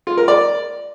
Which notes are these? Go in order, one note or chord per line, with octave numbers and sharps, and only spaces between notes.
F4
A#4
D5